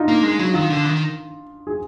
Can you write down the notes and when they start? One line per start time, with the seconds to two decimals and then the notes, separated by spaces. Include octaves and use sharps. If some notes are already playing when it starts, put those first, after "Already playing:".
Already playing: D4 D#4 F4
0.08 A#3
0.23 G#3
0.39 F#3
0.54 D#3 F4
0.70 D3
0.86 D#3
1.67 G#4